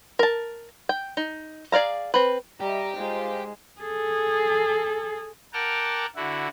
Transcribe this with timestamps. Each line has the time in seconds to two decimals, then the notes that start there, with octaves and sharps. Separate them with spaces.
0.19 A#4 A5
0.89 G5
1.17 D#4
1.72 G#4 D5 F5 A#5
2.14 C4 B4
2.60 G3 G4 D#5 E5 A#5
2.97 G#3 D#4 F4 C5
3.80 G#4 A4
5.53 A#4 F#5 G5 A5 D6 F6
6.16 D3 E4 F#4